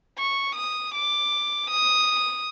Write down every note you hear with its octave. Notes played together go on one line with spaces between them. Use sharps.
C#6
D#6
D6
D#6